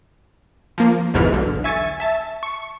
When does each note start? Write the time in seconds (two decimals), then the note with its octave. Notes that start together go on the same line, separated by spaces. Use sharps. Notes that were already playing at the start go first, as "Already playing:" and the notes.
0.78 F3 A#3
1.14 G1 E2 G#2 B2 E3 F6
1.32 B1 D3
1.64 E5 G#5 C#6 A6
2.00 E5 A5
2.43 C#6